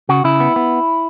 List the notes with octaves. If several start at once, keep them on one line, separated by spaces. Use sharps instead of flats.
C#3 F#4
C#3 E4
B3
B3